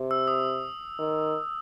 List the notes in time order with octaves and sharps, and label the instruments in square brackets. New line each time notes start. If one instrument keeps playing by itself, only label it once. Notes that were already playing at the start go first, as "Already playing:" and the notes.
Already playing: [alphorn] C3
[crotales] E6
D#6
[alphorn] D#3